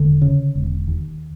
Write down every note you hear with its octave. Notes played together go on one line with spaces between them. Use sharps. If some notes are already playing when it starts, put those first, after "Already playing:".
Already playing: E1 D3
C#3
E1
D#2